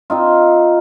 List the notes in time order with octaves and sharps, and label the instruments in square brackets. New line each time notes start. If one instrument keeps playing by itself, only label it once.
[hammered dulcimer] C4 D#4 F4